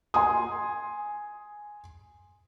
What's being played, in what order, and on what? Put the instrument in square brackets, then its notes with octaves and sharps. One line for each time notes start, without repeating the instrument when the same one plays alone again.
[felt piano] G#5 C6 D#6